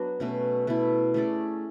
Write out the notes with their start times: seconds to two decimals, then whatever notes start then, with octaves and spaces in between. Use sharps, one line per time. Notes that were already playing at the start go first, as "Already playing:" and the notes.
Already playing: F#3 B3 D4 F#4
0.20 B2 A3 C#4
0.67 B2 A3 E4
1.14 A3 C#4 G#4 D5